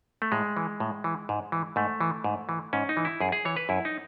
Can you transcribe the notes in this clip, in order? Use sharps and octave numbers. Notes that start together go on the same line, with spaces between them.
A3
A2 G#3
E3
A2
E3
G#2
E3
G#2 A3
E3
G#2
E3
G#2 C#4
D#4
E3
E4
F#2 G#4
G#4
E3 C#5
B4
F#2 E4
D#4